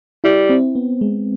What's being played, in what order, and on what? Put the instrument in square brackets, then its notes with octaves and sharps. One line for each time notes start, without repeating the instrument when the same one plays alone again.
[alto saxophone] G3 [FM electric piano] E4
[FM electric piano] C4
B3
G#3